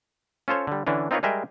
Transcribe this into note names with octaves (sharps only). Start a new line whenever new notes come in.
C#4 F4 A4 C5 C#5
D3 G3
D3 E3 C#4 D4
C4 D#4 F4 A#4 B4 C#5
G3 G#3 G#4 A#4 E5 G5